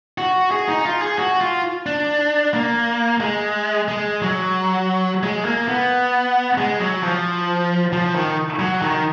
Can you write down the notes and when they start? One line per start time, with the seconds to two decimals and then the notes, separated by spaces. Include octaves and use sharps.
0.18 F#4
0.51 G#4
0.68 D#4
0.85 F4
1.02 G#4
1.18 F#4
1.41 F4
1.86 D4
2.53 A#3
3.20 G#3
3.88 G#3
4.22 F#3
5.23 G#3
5.45 A#3
5.68 B3
6.58 G#3
6.80 F#3
7.03 F3
7.93 F3
8.15 D#3
8.59 F#3
8.82 D#3